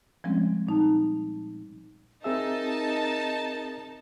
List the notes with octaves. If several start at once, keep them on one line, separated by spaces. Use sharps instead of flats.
F3 G3 G#3 C4 C#4
A#2 D#4 A5
C4 D#4 G#4 A#4 E5 A5